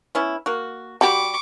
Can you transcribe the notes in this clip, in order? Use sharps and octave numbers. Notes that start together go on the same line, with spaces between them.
B3 C#4 E4
A#3 F#4
G3 F#4 G4 A5 B5 C#6 D6